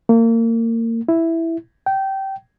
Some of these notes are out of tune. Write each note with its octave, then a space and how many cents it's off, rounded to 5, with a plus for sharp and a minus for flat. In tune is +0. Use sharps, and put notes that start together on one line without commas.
A#3 -30
E4 +0
G5 -20